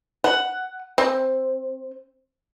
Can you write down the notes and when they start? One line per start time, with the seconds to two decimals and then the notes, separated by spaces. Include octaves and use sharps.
0.24 F#5
0.98 C4